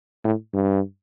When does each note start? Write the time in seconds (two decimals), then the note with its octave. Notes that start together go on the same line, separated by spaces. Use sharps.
0.24 A2
0.54 G2